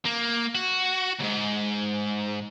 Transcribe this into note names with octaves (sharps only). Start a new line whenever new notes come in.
A#3
F#4
D#2 G#2